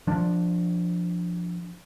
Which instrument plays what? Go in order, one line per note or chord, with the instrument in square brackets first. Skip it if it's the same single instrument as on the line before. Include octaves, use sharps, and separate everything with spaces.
[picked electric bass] F3 D4